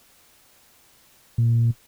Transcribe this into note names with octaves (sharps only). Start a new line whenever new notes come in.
A#2